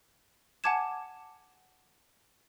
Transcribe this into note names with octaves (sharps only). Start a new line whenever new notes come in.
F#5 G#5 A5 D6 G#6 E7